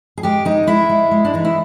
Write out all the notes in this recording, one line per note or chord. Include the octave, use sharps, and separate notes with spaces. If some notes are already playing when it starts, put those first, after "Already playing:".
G#4
G#3 G4
G#3 D#4
G#3 E4
G#3
G#3
D4
E3 D#4
E4